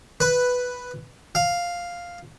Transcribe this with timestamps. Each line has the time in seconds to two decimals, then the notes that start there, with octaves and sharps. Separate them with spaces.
0.20 B4
1.35 F5